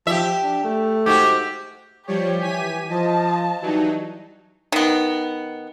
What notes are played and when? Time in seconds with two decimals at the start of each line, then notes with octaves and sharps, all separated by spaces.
0.07 F3 G4 E5
0.44 D4
0.64 A3
1.06 G#2 F#4 G4
2.07 F3 G3 G4 C#5
2.41 E3 G#5 B6 D#7
2.90 F3 D#5 A5
3.62 E3 F#3 G3 D#4
4.72 D#3 B3